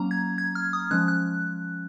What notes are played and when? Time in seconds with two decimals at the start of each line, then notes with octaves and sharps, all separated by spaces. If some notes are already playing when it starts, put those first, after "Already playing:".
Already playing: F#3 A#3 C#4 A#5
0.11 G#6
0.38 G#6
0.55 F6
0.73 D#6
0.91 F3 G#3 C#4 F#6
1.08 F#6